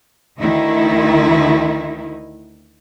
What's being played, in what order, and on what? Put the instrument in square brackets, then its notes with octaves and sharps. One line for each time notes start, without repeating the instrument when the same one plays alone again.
[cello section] D2 D#3 D#4 E4